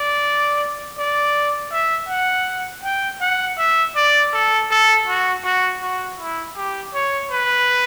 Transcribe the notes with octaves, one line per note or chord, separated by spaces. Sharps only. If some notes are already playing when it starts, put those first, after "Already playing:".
Already playing: D5
D5
E5
F#5
G5
F#5
E5
D5
A4
A4
F#4
F#4
F#4
E4
G4
C#5
B4